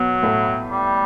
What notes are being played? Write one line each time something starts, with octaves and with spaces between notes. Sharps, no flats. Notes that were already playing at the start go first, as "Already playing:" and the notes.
Already playing: B2 F#3 B3
A2 A3
G3